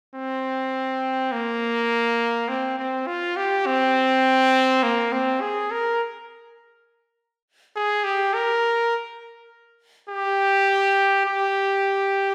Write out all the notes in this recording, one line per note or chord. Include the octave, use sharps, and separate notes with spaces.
C4
A#3
C4
C4
F4
G4
C4
A#3
C4
G#4
A#4
G#4
G4
A#4
G4
G4